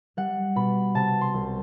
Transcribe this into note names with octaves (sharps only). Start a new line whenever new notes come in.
G3 F#5
B2 B5
C3 A5
C6
C2